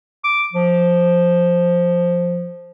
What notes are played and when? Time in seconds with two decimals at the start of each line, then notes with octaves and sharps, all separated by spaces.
0.24 D6
0.53 F3